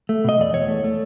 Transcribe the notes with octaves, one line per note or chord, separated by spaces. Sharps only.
A3
B2 D#5
E2 D5
E2 C#5
A3
A3